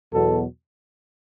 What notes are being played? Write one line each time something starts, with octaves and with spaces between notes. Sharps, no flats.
E2 B2 F#3 A4